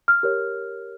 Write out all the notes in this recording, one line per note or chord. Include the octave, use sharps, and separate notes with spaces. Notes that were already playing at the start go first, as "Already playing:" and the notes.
F6
G4 A#4 C#5